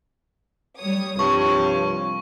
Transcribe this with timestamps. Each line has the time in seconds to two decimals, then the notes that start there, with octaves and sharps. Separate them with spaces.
0.78 G3 C#5 D#6
1.19 C2 G2 F3 C#5 C#6